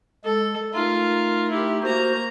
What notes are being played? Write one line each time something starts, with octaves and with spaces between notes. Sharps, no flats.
G#3 A4
A3 D#4 F4 A#4
E4 G4
A#3 F#4 C5 A#5